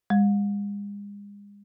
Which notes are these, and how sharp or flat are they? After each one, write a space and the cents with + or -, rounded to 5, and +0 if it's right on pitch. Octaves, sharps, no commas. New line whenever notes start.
G#3 -40